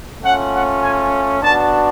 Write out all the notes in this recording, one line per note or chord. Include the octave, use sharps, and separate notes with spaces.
A3 C#4 F4 F#5
F#5
G#5
B3 D4 F#4 A5